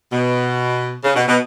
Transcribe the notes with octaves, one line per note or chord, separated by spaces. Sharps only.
B2
C#3
B2
B2